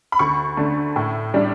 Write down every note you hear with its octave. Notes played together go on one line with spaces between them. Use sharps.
B5
D2 C#6
D3 A3
A2
G3 D4